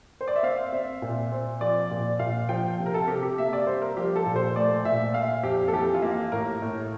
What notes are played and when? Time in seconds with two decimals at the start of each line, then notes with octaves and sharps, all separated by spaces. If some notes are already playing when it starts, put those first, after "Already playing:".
0.21 C5
0.28 D5
0.36 E5
0.43 C4 F5
0.72 C4 E5
1.02 A#2
1.32 C4
1.61 F3 D5
1.91 A#2
2.19 A#2 F5
2.49 F3 G5
2.79 C3
2.86 A#4
2.94 A4
3.08 C3 G4
3.23 G4
3.38 A#3 E5
3.53 D5
3.67 G3 C5
3.82 A#4
3.97 F3 G4
4.16 A4
4.26 A#2
4.36 C5
4.55 A3 D5
4.85 A#2 E5
5.14 A#3 F5
5.43 F2 G4
5.68 A4
5.73 E3 G4
5.94 F4
6.02 A#3 G4
6.32 A2 A#4
6.62 A2